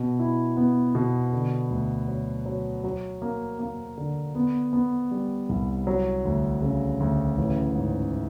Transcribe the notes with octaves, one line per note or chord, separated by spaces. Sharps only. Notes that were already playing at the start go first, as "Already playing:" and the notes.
Already playing: B2
E4
B3
B2
D3
D2
F#3
F#3
F#3
A#3
A#3
D3
B3
B3
G3
C2
F#3
D2
C#3
D2
A1
G#2